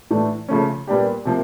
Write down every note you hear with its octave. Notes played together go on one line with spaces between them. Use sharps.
A2 E3 A3 D4
C#3 F3 A3 C#4
A#2 G3 B3 D4 G4
C3 F3 A#3